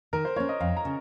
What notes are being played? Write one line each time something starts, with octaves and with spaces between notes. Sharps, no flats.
D#3 A#4
C5
A#3 C#4 C#5
D#5
F2 F5
A#5
C#3